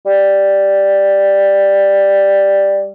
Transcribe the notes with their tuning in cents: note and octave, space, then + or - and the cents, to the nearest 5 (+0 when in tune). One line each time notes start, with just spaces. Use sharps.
G3 +5